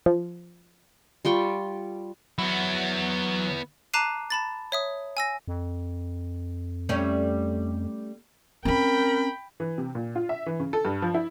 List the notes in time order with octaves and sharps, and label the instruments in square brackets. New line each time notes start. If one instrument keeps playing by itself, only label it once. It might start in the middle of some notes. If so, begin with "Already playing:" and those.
[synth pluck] F3
[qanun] G3 F4 G5 C#6
[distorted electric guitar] F#3 F#4 [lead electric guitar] B3 E4
[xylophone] A5 A#5 D6 F#6 C7 D#7
A5 B5 A6
C#5 E5 D#6
G#5 E6 A#6
[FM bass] F2
[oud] G3 A3 C#4
[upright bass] C4 C#4 [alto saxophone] A#4 [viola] G5 B5
[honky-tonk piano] E3
C3
A#2
F4
E5
E3
C#3
A4
G2
F3
E4